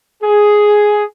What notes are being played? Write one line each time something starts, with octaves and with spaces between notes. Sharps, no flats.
G#4